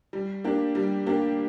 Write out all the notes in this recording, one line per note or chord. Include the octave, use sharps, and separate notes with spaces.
G3
A#3 D4 G4
G3
A#3 D4 G4